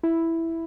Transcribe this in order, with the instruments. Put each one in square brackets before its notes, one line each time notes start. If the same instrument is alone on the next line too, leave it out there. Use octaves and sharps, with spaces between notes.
[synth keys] E4